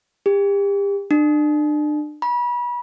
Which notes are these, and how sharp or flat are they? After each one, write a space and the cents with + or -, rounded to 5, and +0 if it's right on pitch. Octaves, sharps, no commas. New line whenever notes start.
G4 +35
D4 +35
B5 -30